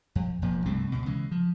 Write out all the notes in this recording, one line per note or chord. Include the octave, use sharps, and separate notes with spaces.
F2
E1 A#2 F3
C2 G2 A3 C4
C#2 B2
C#3 E3 G#3
F3